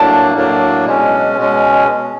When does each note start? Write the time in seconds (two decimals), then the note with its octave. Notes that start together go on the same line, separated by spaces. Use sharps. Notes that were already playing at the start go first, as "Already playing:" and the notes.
Already playing: A2 F#3 A#3 D4 A5
0.35 A2 F#3 A#3 D4
0.85 B2 G#3 C#4
1.37 B2 G#3 C#4